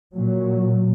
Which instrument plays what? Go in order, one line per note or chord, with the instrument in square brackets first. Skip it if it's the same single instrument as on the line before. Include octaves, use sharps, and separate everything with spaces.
[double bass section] A#2 F#3